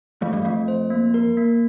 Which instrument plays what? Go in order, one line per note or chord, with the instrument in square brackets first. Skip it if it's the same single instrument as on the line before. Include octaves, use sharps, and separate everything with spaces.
[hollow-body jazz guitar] F2 [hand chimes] A3
[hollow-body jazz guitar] G2
[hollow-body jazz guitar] F2 [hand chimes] A3
[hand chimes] C5
A#3
A#4
A#3